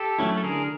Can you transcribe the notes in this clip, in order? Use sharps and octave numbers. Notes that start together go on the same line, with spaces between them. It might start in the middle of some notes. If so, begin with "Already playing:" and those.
Already playing: G4 A4
F#3 A3 C#4 E4
A4
D3 G#4 A#4